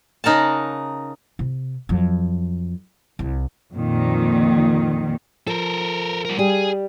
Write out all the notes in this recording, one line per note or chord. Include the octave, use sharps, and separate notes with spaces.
C#3 D#4 A#4 F#5 A5
C3
F2 F#3
C2
F2 A#2 D#3
F3 A4 A#4
G3 A#4
G3 G#4